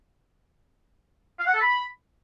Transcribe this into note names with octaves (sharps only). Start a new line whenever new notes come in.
F5
F#5
A4
B5